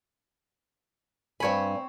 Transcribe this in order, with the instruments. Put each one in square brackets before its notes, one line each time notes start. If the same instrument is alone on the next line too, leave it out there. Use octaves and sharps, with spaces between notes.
[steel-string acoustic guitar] G2 G#5 [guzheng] C4 C#5 B5